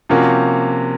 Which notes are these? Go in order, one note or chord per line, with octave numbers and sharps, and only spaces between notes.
C3 F3 A#3 C#4 F#4